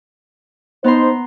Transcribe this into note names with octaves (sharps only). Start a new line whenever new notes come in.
B3 D#4 C5 A#5 C6